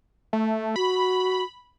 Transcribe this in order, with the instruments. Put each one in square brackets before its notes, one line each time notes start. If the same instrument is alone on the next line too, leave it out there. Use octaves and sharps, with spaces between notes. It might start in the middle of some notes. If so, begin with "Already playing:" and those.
[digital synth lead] A3
[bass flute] F#4 [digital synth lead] B5